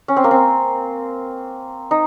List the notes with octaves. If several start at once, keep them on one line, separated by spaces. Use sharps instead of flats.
C#4
C4
A#3
C4
D#4